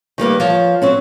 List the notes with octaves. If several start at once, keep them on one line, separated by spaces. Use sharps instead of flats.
D#3 G3 A#3 B3
F3 C#5
F#3 C4 C#4